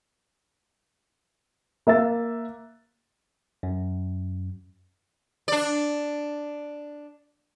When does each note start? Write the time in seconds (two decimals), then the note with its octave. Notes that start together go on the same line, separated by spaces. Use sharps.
1.87 A#3 E5 E6 A6
3.63 F#2
5.48 D4 D5